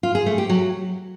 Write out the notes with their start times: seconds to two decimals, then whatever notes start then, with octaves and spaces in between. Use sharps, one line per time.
0.03 F4
0.15 G#4
0.26 A3
0.38 G4
0.49 F#3